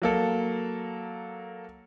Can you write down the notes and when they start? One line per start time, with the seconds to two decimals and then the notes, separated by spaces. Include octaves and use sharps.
0.02 F#3 A#3 A4